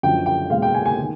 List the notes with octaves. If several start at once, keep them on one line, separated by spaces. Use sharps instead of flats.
F#2 D3 F3 G5
G5
E2 B2 G#3 F5
G5
G#5
G#5
D#3